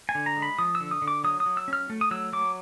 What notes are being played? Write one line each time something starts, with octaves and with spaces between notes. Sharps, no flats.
G#5
D3
A#5
G#3
B5
F3 D#6
E6
D3
D#6
D3
D6
F#3 D#6
D#6
F#3
E6
C#4
F6
A3
D#6
F#3 E6
F#3 D6